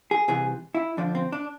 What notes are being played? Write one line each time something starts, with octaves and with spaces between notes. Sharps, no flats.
G#4
C2 C3 E3 G#4
E4
F2 D3 F3 D4
C4
D4